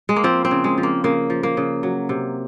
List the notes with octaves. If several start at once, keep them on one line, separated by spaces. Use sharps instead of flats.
G#3
A#3
F3 C4
C4
C#3
G#3
F3
A#3
C#3 A#3
F3
A#3
C#3
F#3
C3